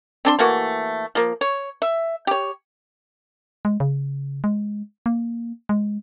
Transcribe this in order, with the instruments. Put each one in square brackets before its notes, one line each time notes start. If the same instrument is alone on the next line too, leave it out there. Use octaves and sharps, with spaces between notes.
[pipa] C4 D4 C6
E3 A3 A#3 F#4
F3 A#3
C#5
E5
G4 C#5
[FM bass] G#3
C#3
G#3
A#3
G#3